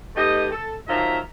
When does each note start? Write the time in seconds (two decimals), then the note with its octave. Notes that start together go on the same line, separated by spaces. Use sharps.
0.16 A3 B3 D#4 G4 D#5
0.52 A4
0.88 D#3 F3 F#3 F4 E5 A#5